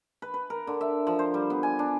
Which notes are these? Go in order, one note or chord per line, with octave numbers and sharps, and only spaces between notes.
B4
B4
A#4
D3
E5
F3
C5
G3
B3
G#5
D4